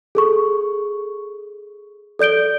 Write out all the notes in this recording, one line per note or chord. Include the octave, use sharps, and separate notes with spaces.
G#4 A4 C#6
A4 D5 G6 D7 G7